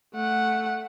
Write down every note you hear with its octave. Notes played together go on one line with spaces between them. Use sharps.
A3 F#5